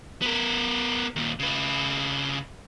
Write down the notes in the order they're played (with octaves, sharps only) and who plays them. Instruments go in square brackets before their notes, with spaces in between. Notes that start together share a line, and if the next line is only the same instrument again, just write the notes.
[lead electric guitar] B3 A#4
D#2 A#2
C#3 B4